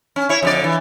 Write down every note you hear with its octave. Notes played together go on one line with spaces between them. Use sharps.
C#4
E4 C#5
F2 D3 D5
E3